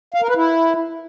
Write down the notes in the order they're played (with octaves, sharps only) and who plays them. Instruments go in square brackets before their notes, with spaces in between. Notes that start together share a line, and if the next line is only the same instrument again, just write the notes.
[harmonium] F5
A#4
B4
E4